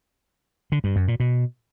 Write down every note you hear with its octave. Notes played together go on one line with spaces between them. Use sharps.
D3
G2
F#2
A#2
B2